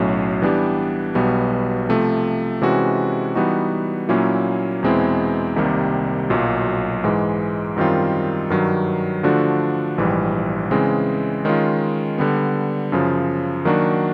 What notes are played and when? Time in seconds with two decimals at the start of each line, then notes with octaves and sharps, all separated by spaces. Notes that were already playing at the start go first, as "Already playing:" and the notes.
Already playing: B1 A2 F#3 A3 C#4
0.42 E3 G3 B3 D4 G4
1.15 B1 B2 G3 B3
1.89 C3 F3 A3
2.62 C3 E3 G#3 C#4 F#4
3.35 E3 G3 B3 D#4 F#4
4.09 A#2 F#3 A#3 C#4 E4
4.83 E2 B2 G#3 C4 E4
5.56 C2 C3 D#3 G3 A#3
6.30 B1 A#2 F#3
7.04 G#2 E3 G#3
7.76 F#2 D#3 G3 C4 F4
8.50 G2 D#3 F#3
9.23 D3 F3 A3 D4 F#4
9.98 A#1 G#2 E3 G3
10.71 C#3 E3 G#3 C4
11.45 D#3 G#3 C#4 F4
12.18 D3 G3 B3
12.92 F#2 C#3 F3
13.65 D#3 F#3 A#3 D4 F#4